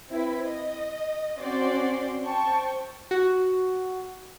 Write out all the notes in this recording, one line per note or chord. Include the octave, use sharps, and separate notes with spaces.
C4 E4 B4
D#5
C4 C#4 F#4 C5 D5 C6
C5 G5 A5 C#6
F#4